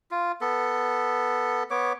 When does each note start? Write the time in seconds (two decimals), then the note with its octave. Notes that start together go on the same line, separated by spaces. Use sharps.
0.11 F4
0.41 B3 A4
1.71 B3 C#5 D6